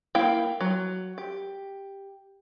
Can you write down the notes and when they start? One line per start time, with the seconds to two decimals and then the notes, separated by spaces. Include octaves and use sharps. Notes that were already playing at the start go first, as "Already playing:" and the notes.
0.15 A#3 E4 F5 G5
0.61 F#3
1.18 G4